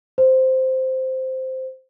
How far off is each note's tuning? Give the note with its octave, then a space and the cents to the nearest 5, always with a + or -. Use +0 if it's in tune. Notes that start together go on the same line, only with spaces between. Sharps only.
C5 -5